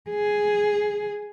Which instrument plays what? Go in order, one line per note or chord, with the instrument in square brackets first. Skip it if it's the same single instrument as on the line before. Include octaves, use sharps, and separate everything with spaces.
[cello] G#4